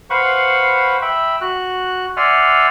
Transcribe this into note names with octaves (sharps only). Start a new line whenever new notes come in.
B4 C5 F5 F#5 B5 C#6
E5 G5 B5
F#4 F#6
D5 E5 F#5 G#5 C6 F6